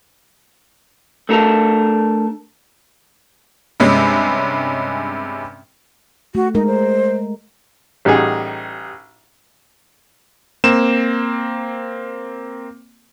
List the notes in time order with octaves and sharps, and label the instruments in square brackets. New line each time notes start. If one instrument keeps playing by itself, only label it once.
[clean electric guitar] A3 D4 A4 A#4
[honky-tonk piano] G2 C3 G#3 C#4
[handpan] A3 [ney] F#4
[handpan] G#3 A#4 [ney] D#4
[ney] C5
[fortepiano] A1 G3 D#4 F#4 G#4
[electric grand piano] A#3 C4 E7